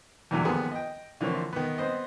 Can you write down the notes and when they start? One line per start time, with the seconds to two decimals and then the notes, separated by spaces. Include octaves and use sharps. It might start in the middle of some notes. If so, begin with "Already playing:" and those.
0.31 E2 G2 A#2 D3 E3 F#3
0.45 G#1 D#2 F3 A#3 B3 G#4
0.71 D#5 G5
1.21 D3 E3 F3 A#3 C4 C#5
1.53 D#3 B3
1.78 B3 C4 C5 D#5